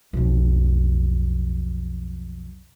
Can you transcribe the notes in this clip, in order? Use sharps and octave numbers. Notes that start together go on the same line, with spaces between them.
B1 F2